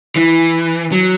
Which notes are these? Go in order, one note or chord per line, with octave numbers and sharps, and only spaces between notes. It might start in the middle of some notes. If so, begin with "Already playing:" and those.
E3
F#3